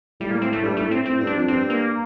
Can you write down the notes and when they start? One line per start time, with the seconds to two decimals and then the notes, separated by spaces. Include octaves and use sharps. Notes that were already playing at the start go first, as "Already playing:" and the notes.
0.20 A2 G3
0.31 A#3
0.42 C4
0.53 A3
0.63 G2 G3
0.77 A2 A3
0.91 C4
1.06 A2 C4
1.20 G2
1.27 D4
1.34 F2
1.48 G2 C4
1.70 A#3